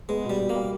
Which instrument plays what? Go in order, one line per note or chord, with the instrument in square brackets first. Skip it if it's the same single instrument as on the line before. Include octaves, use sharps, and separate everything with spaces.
[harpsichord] G#3 [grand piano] B3
[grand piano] B2 [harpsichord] G3
[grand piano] B2
[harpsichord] A#3
[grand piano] G3